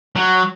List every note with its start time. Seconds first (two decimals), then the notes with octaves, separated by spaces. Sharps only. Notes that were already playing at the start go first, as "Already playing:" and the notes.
0.16 F#3